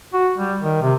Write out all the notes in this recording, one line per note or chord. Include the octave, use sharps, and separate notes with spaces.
F#4
G3
D#3
C3